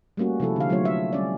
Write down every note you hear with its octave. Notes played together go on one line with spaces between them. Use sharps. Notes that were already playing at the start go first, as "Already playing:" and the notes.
G3 A3 A#3 C#4 F#4
C3 F3 E4 A4
D3 F5
F#3 A3 B3 F4 C#5
E5
G3 C#4 D5